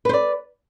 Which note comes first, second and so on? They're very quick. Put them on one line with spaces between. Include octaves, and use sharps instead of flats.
B4 C5 D5